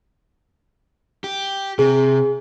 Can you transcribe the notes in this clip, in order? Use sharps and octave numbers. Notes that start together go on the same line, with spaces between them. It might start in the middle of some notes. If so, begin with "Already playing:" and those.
G4
C3 G#4